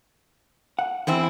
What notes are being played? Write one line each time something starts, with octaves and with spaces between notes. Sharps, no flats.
F#5
E2 C4 E4